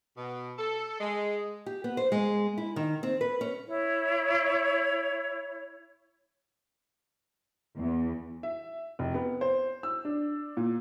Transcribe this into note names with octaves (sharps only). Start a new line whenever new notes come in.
B2
A4
G#3
G4
B3
C5
G#3
E4
D#3
C4
B4
C#4
E4 C#5
E2
E5
F1
B3
C5
E6
D4
A#2